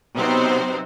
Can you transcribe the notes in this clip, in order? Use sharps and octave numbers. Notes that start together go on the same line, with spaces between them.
C3 F#3 B3 C4 D#4 C5